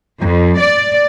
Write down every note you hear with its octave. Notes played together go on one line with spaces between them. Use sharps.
F2
D5